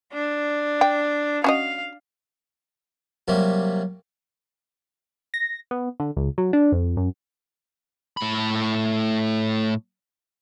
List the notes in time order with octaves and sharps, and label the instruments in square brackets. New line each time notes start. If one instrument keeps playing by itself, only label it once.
[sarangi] D4
[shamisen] G5
[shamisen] C#4 F#4 D#5 [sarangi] F5
[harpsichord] C3 F#3 G3 A#3
[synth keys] A#6
B3
D3
C#2
F#3
D4
F2
F#2
[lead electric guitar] A2 B5